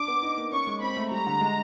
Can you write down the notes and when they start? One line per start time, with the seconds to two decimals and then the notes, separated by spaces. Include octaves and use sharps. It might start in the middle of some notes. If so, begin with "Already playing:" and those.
Already playing: D4 D6
0.08 B3
0.23 D#4
0.38 A#3
0.52 C#4 C#6
0.67 G#3
0.82 C4 B5
0.97 A3
1.11 G3 A#5
1.26 D3
1.41 G#3